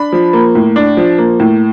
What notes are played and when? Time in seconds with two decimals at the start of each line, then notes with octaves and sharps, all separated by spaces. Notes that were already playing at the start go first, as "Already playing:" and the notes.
Already playing: D4 B5
0.12 F3
0.33 A#3
0.55 A2
0.76 D4
0.97 F3
1.18 A#3
1.40 A2